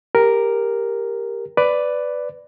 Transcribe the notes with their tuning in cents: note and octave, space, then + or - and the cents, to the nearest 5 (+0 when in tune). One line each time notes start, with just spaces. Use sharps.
G4 +15 A#4 +0
B4 +10 D5 +0